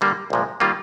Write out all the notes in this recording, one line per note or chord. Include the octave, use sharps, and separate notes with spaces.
D3 G3 A#3
C2 A#2 F3 G#3
D#3 G3 A#3 F4